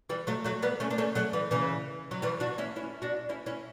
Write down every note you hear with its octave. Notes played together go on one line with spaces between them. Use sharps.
E3 G3
F#3 A3
F#3 A3
G3 B3
A3 C#4
D4
A3 C#4
F#3 A3
E3 G3
C#3 E3
F#3
E3 G3
D4 F#4
C#4 E4
C#4 E4
D4 F#4
C#4 E4
C#4 E4